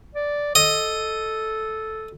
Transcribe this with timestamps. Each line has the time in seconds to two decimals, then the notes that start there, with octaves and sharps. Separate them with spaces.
0.15 D5
0.55 A4 D#5